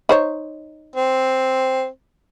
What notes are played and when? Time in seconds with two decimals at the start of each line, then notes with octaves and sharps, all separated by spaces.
0.09 D#4 C5 C#5
0.96 C4